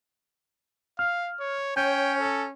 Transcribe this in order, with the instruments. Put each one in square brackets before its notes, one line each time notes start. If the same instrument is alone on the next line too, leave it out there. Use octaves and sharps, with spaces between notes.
[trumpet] F5 [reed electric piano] F6
[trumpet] C#5
[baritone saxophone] C#4 [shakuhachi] C#5 [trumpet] G5 [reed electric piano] G6
[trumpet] A4